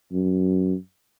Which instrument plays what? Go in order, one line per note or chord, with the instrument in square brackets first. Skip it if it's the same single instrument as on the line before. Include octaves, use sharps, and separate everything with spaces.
[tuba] F#2